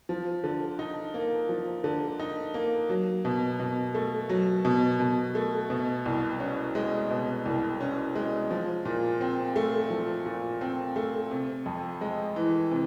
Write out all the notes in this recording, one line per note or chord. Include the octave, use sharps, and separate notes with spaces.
F3
D3
D#4
A#3
F3
D3
D#4
A#3
F#3
B2
B2
A3
F#3
B2
B2
A3
B2
C2
C#4
G#3
B2
C2
C#4
G#3
F3
A#2
C4
A3
F3
A#2
C4
A3
C3
F2
G#3
E3
C3